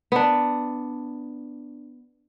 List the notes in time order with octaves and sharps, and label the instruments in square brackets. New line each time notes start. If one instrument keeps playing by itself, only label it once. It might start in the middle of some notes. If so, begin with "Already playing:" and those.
[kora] B3 D4